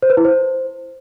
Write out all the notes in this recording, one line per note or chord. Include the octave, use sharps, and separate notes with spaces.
C5
B4
E4
C5